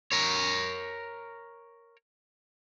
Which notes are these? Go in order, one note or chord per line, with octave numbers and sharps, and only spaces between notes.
A#4 C#5